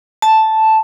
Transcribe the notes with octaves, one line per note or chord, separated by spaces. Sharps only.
A5